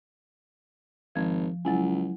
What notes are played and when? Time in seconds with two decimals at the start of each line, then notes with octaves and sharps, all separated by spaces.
1.15 G#1 F3 G#6
1.65 C#2 F#3 E4 G#5